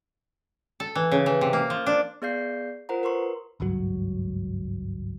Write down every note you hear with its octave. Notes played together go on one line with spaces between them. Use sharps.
A4
E3
C#3
E3
C3
A#3
F3
D4
B3 G#4 D5 F5 G6 C7
F4 A#4 C5 F#5 A#5
A#4 B4 C6 C#6
G#1 C#2 G2 F#3